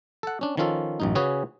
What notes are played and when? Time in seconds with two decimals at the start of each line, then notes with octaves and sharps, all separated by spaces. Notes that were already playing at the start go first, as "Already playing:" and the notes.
0.23 A4 F#5
0.41 C#4 D4
0.57 D#3 F3 C#4 F4 A4
1.00 A1 F#2 D#4
1.15 C#3 C#4 F#4 G#4 B4